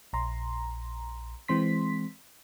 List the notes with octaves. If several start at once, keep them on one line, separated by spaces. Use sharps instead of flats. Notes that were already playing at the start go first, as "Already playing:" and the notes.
A#1 A#5 C6
E3 G#3 C4 C6 B6